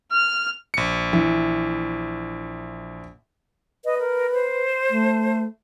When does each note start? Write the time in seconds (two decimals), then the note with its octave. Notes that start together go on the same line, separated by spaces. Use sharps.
0.11 F6
0.74 A#1 C#7
1.13 E3
3.85 B4 D#5
3.99 A#4
4.33 C5
4.90 A3